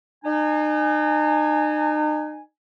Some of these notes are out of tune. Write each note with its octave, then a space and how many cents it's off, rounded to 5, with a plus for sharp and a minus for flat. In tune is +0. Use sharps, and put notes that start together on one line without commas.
D#4 -40 G#5 +0